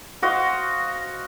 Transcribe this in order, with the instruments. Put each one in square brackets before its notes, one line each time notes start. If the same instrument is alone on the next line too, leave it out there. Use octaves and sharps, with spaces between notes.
[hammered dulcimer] F#4 C5 D#5 F5